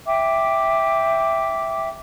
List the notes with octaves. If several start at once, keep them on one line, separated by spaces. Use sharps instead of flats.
E5 G5 D6